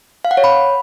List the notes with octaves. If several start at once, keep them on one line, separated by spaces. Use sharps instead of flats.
F5
F#5
C#5
B5